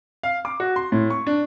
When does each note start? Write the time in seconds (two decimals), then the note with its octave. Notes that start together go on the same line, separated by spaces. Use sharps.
0.23 F5
0.45 D6
0.60 F#4
0.76 C6
0.92 A2
1.10 C#6
1.27 D4